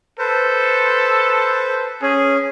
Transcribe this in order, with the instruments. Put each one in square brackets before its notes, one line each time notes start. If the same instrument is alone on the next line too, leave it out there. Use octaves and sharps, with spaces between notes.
[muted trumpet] A4 [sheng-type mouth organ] B4 C5
[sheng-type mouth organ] C#4 [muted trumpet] G#4